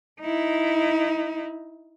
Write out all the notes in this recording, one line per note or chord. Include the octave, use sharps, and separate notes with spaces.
D#4 E4